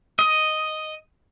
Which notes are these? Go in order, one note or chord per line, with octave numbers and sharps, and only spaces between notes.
D#5